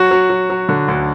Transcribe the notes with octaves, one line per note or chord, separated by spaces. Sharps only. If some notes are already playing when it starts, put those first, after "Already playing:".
Already playing: F#3 F#4
F#3
F#3
F#3
D3
D2